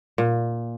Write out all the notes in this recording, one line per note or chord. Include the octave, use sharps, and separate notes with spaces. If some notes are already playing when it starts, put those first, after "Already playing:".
A#2